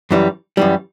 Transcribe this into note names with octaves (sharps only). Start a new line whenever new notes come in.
F#2 E3 G3
F#2 E3 G3